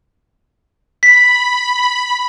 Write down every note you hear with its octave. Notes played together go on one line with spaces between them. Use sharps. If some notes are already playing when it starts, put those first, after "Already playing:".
B5 B6